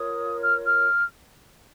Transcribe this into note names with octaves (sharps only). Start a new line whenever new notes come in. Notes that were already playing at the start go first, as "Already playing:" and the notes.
Already playing: F4 A#4 C#5 D#6
F6
F6